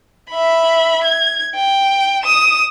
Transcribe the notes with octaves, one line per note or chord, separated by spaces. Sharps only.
E5 B5
G#6
G5
D#6 E7